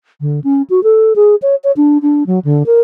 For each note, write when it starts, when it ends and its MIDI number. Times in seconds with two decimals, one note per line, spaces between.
0.21 0.40 50
0.44 0.62 61
0.70 0.83 66
0.83 1.13 69
1.16 1.35 68
1.42 1.55 73
1.64 1.71 73
1.77 1.98 62
2.02 2.26 62
2.26 2.39 54
2.44 2.63 50
2.66 2.81 70